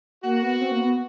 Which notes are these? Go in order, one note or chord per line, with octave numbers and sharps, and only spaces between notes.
A#3 F#4
B3
C4
A#3
B3